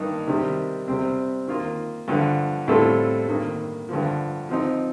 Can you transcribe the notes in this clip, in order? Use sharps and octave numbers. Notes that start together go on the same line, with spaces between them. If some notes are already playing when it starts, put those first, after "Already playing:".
Already playing: G2 D#3 A#3 D#4
C3 D#3 G3
C3 G3 C4
D#3 A#3 F4
G2 D3 F3
A2 G3 C4 F4 A4
G2 D#3 A#3
G2 D3 F3
F3 C4 D#4